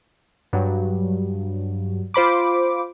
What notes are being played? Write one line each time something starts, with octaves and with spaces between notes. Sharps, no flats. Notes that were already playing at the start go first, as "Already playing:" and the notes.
G2 F#3
F4 C5 B5 D6